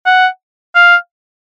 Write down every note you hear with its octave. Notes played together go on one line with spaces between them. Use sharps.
F#5
F5